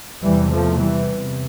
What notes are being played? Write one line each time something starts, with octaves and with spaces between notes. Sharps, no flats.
E2 C3 E3 G3
F3 A3
E3 G3
E2 C3